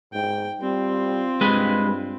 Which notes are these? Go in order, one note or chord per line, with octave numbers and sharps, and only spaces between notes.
G#2 G5
G3 C4 F4
G2 G#3 G#4 B4